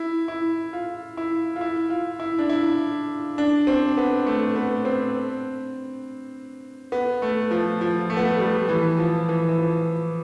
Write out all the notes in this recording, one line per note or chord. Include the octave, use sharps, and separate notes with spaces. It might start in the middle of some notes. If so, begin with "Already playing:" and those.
Already playing: E4
E4
F4
E4
F4
E4
F4
E4
D4
E4
D4
C4
B3
A3
B3
C4
B3
A3
F3
F3
A3
B3
A3
G3
E3
F3
E3
E3
F3